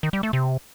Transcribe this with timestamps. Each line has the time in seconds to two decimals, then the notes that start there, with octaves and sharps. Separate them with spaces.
0.03 D#3
0.13 G3
0.23 A3
0.33 C3